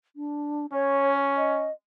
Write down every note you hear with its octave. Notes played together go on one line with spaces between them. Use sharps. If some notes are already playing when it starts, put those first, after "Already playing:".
D4
C#4 C#5
D#5